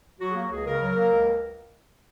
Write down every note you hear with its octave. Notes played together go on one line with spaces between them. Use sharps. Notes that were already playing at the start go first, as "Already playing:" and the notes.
F#3 F#4
G#4
A#3 F#4
C#2 G#4
C#3 A#4
F#3 A#4
A#3
C#2